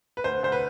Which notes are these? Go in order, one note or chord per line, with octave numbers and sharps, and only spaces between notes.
B4
D2 C5
D2 C5
B4